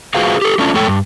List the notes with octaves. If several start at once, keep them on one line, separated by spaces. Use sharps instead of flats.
F4 F#4 G#4 B4 C5 F5
G4 A4
A3 C#4 D4 F4
F2 A2 G#3 A4 C#5 G5
G2